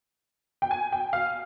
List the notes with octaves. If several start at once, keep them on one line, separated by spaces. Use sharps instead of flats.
G5
G#5
G5
F5